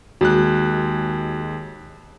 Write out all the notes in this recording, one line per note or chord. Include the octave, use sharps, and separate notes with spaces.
D#2 G#3 F#4 F#6